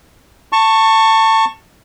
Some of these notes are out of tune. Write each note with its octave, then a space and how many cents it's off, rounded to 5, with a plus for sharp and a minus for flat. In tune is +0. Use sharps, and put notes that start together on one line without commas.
A5 +25 C#6 -5